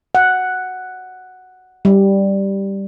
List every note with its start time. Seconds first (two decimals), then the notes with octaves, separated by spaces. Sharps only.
0.15 F#5
1.85 G3